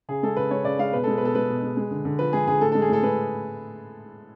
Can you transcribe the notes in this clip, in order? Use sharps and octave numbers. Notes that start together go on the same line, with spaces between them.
C#3 G#4
G#3 A4
C#3 B4
G#3 C#5
C#3 D5
G#3 F5
B2 B4
G#3 A4
B4
B2 A4
G#3 B4
B2
G#3
G#3
D3
D3
F3 B4
G#3 G#4
D3 G#4
A2 A4
G#3 A4
G#4
A2 A4
G#3 B4